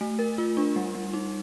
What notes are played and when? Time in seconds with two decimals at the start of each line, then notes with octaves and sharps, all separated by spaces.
0.01 A3
0.19 A#4
0.38 F4
0.57 D4
0.76 G3
0.95 G3
1.14 D#4